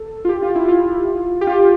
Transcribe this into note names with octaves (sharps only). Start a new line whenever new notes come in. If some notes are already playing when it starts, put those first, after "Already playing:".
Already playing: A4
F4
G4
F4
E4
F4
G4
F4